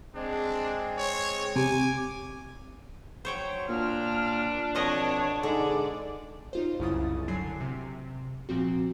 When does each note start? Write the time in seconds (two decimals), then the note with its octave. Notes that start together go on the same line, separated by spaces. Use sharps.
0.15 G#3 C4 D4
0.97 C#5
1.56 C3 G#5 D6
3.25 F#3 C5 C#5 G5
3.69 A#2 D4 F6
4.75 F2 B2 C#5 D#5 F#5
5.43 G#2 D3 G#3 D5
6.53 D#4 F4 C5
6.80 C2 F#2 C#3 E4 D#6 A6
7.28 D3 F#3 G#5 C7
7.60 C3
8.49 A#2 F3 C4 F#4